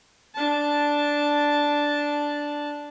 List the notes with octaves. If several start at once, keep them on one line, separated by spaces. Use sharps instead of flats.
D4 A5